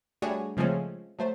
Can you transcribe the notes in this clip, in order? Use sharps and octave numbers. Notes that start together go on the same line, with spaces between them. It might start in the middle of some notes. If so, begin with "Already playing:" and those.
G3 A3 D4 F#4 G#4 C#5
C#3 F3 G#3 A3 C4 C#4
F#3 A3 C5